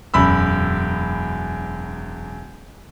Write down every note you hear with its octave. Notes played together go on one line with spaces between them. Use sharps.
E1 F#2 B5 E6